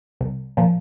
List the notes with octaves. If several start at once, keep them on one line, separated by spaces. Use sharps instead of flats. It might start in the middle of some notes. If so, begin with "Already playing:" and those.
C2
A#2 F3